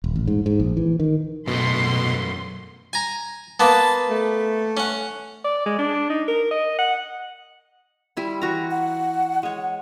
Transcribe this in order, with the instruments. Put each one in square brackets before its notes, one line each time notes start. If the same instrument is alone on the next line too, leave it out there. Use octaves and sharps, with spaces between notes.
[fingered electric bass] D#1
A1
G#2
G#2
A#1
E3
D#3
[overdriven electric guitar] F#2 A3 [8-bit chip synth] B2 [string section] C6
[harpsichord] G#5 A#5
[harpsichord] A#3 B3 [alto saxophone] A5
[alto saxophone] A3
[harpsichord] C#4 F#5
[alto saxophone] D5
G#3
D4
D#4
A#4
D#5
F#5
[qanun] G3 E4 C6
E3 F#4 A#5
[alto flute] F#5
[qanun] G#3 C#5 [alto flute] F#5